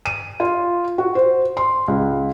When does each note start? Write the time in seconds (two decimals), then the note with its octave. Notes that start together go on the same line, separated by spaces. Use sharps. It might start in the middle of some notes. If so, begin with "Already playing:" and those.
0.06 D#7
0.40 F4
0.98 F#4
1.15 C5
1.57 C6
1.88 C#2